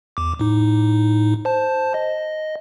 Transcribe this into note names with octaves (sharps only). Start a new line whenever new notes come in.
E2 D6
A2 D#4
C5 A5
D#5